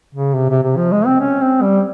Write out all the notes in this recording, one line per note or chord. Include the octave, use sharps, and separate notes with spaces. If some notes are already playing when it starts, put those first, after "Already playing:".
C#3
C3
C3
C3
F3
G#3
C4
C#4
C4
G3